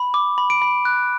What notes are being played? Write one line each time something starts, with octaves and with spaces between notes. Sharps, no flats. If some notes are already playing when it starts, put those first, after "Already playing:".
Already playing: B5
D6
B5
D7
B5
F#6